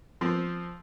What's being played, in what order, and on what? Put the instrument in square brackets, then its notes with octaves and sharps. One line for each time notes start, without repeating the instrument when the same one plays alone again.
[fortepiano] F3 C4